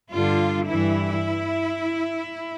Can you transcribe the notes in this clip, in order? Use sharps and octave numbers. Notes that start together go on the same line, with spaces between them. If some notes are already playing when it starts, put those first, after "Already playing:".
G2 D3 G3 F4
G2 E3 G3 E4